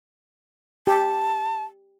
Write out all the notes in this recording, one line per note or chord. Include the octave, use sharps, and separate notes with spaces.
G4 A5